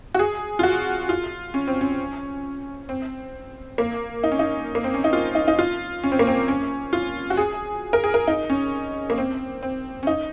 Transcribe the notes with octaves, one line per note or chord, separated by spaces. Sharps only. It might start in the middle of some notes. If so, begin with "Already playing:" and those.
F#4
G#4
F4
F#4
F4
C#4
C4
C#4
C4
A#3
D#4
C#4
D#4
A#3
C4
C#4
D#4
F4
D#4
D#4
F4
C#4
C4
A#3
C4
C#4
F4
F#4
G#4
A#4
G#4
A#4
D#4
C#4
A#3
C4
C4
C#4
D#4